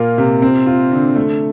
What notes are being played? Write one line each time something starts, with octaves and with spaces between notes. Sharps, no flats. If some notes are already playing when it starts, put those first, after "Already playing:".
Already playing: A#2 A#3 F4
C3
C4
F4
D3
A3